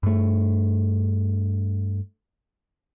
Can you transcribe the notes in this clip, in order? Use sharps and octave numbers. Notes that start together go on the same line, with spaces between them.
G2 A3